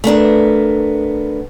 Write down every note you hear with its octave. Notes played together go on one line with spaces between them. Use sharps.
A3 B3 D4 A#4